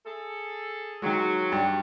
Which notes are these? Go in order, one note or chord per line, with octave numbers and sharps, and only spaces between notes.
G#4 A4
D#3 F#3 G#3
G2